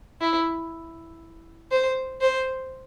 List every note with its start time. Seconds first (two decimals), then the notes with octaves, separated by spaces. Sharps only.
0.21 E4
1.71 C5
2.21 C5